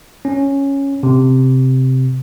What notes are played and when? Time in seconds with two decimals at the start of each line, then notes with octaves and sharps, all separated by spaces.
0.25 C#4
1.03 C3